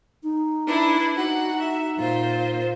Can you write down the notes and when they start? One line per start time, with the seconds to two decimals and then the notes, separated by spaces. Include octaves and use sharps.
0.23 D#4
0.66 D4 E4 B4
1.16 D#4 F#4 F#5
1.60 E5
1.97 A#2 F4 C5